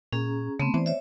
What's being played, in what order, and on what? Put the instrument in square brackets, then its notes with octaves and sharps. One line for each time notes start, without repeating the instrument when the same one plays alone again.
[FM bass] A#2 [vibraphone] C#4 G#4 A#5
[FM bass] C#3 [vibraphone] A3 B3 C4
[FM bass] E3 [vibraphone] C5 D5
[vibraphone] C#5 E5